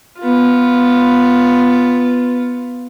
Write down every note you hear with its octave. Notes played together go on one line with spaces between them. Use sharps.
B3 F4